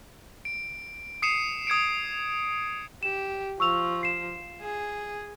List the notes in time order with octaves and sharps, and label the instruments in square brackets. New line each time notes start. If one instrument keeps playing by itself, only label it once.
[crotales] D7
D#6 C7 C#7 D#7 E7
D#6 G#6 C#7 D7
[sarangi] G4 [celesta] E7
[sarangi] F3 [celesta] C#6 E6 F7
[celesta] C7 E7
[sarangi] G#4